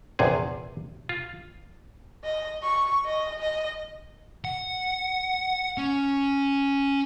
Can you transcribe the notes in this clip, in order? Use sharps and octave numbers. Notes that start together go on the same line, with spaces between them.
A#1 E2 C3 G#4
F4
D#5
C#6
D#5
D#5
F#5
C#4